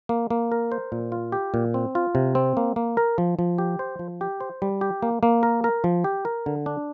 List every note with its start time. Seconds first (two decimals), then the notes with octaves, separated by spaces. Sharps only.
0.09 A#3
0.30 A#3
0.52 A#4
0.72 C5
0.92 A#2
1.12 F4
1.32 G4
1.54 A#2
1.74 C4
1.95 F4
2.15 C3
2.35 C4
2.57 A#3
2.76 A#3
2.97 A#4
3.18 F3
3.39 F3
3.58 G4
3.79 C5
3.99 F3
4.21 G4
4.40 C5
4.62 G3
4.81 G4
5.02 A#3
5.23 A#3
5.43 A#4
5.64 A#4
5.84 F3
6.04 G4
6.25 A#4
6.46 D3
6.66 D4